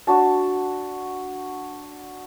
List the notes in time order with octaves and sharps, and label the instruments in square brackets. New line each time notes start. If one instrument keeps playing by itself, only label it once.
[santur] D4 F#4 A5